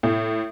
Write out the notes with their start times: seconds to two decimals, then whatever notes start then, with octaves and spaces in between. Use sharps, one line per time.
0.03 A2